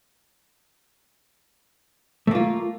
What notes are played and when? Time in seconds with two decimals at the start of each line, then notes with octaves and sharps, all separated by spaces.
2.27 A3
2.31 A#3
2.35 F4